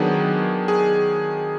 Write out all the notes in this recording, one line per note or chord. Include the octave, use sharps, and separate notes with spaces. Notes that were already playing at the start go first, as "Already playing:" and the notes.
Already playing: D#3 F#3 B3 D4 G#4
G#4